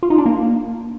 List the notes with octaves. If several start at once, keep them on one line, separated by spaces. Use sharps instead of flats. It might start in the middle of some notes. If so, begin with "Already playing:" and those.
F4
D#4
D4
A#3